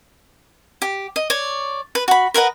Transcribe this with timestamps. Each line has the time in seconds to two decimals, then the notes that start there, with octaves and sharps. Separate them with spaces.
0.82 G4
1.16 D#5
1.30 C#5 D5
1.95 B4
2.08 F#4 B5
2.34 A#4 B4 D#5 F#5